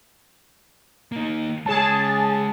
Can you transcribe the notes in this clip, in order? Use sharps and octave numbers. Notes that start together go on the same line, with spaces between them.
A#3 D#4
G#3 G#4 C#5 A5